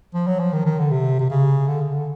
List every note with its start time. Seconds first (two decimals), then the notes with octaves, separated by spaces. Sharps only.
0.14 F3
0.27 F#3
0.40 F3
0.53 D#3
0.65 D#3
0.79 D3
0.91 C3
1.19 C3
1.30 C#3
1.68 D3
1.81 C#3
1.94 D3